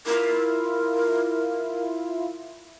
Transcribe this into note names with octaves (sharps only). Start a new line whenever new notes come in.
E4 F4 A#4